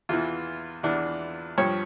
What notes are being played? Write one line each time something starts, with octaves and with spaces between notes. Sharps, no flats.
E2 E3 F4
E2 E3 D4
G2 F3 C#5